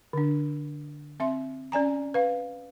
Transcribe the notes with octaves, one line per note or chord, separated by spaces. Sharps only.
D3 D4
C4 E5 C6
C#4 D5 G#5 A#5
B4 F5